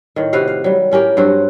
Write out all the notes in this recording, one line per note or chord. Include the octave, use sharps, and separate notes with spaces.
A2 D#3
C3 F#4 B4 F5
F5
F#3 G3
A2 C#4 G4 A#4
G2 F#3 C4 F#4